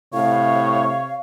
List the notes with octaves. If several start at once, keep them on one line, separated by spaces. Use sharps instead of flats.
A2 C3 C#5 F5